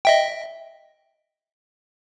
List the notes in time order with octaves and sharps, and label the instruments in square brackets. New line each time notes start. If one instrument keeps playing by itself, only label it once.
[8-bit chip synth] D#5 E5 G5